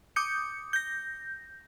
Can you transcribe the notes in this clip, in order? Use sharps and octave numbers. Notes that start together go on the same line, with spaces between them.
D6 D#6 G6 C#7
G6 A#6